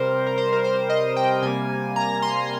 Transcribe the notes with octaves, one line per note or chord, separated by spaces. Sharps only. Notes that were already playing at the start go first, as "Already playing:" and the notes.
Already playing: C3 G3 A#4 C5
A#4
C5
A#4
C5
D#5
G5
C3 G3 A#3 G#5
A#5
C6